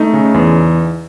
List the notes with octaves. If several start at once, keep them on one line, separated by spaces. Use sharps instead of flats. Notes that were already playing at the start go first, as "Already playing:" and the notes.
Already playing: A3 D#4
C#3
E2